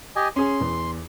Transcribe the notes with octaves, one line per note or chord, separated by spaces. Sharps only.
G4 D#5 G#5
C#4 G#4 C6
E2